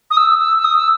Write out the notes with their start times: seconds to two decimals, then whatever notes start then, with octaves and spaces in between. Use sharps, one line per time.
0.11 D#6
0.17 E6
0.41 E6
0.58 E6
0.64 D#6
0.77 E6